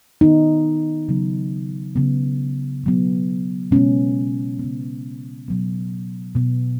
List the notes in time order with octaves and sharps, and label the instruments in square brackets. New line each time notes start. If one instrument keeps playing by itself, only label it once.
[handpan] D#3 B3 D#4
C#3 F#3 B3
C#3 F#3 B3
B2 F#3 B3
B2 G#3 B3 C#4
C#3 B3
B2 F#3 B3
B2 B3